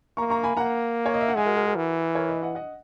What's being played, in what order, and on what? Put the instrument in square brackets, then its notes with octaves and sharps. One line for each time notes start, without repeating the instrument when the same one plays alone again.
[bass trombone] A#3 [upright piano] A#5 C#6
[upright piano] A#5 C#6
G#5 B5
[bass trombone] A#3 [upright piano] F#5 A#5
[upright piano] C#5
D#5
E5
F#5
[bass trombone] G#3 [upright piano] E5 G#5
[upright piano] F#4 A#4
F#4 A#4
F#4 A#4
[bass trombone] E3
[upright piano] A#4 C#5
B4 D#5
D#5 F#5
D#5 F#5